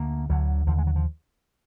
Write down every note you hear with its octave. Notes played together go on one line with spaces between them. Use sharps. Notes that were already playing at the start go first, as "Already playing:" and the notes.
Already playing: D2 D3 A#3
D2 D3 F#3
D#2 D3 F3
G#3
F#3
F3